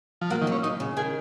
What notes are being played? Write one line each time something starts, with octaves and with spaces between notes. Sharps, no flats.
F3
F#3 A#3
D#3
F#3 C#4
F#2 D#4
C#3
D#3 G#4